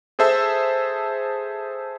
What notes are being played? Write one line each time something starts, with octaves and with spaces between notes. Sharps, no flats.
G#4 A4 C5 E5 A5 E6